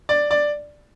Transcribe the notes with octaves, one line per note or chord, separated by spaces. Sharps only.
D5
D5